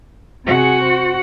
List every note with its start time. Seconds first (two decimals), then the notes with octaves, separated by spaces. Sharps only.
0.46 C3 F#4 G#4 F#5
0.82 C5